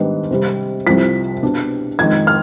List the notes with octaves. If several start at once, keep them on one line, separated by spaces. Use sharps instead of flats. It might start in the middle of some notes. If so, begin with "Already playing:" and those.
Already playing: G#2 D#3 G3 B3 D4
C3 G3 C4
C2 C3 F3 B6
B2 B3 D4
F2 D#3 G#3 G#6
F6